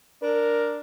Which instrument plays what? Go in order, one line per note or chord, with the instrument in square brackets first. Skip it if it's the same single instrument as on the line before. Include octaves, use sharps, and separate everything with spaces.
[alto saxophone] D4 [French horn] A#4